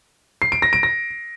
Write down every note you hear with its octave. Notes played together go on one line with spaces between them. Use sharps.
C7
D7
A#6
D7
A#6